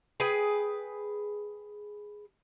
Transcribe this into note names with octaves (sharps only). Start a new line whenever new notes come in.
G#4 B4 G5